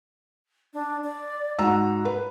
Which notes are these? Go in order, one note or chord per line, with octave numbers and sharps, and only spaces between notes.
D4
D5
G#2 F#4 A#5 E6
B4